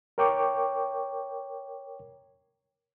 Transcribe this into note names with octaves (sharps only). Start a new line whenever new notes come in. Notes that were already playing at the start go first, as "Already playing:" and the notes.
A#4 C#5 G5 C#6 D6